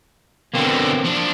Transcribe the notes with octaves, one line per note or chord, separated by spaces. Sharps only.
B2 D3 A#3 C4
F3 D4